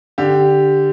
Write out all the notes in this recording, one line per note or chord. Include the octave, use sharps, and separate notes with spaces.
D3 G4